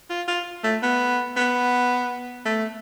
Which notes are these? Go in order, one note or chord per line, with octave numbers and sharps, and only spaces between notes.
F4
F4
A3
B3
B3
A3